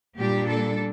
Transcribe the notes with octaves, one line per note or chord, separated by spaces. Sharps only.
A#2 G3 D4 G4
A4